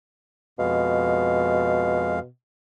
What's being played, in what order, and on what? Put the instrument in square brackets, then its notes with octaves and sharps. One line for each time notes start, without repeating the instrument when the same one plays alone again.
[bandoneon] F2 G#3 F5 [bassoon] B2